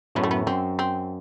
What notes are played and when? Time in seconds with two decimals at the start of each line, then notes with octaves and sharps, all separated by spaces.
0.15 F#2 A2 B3
0.23 A3
0.31 B3
0.47 F#2 C4
0.79 C4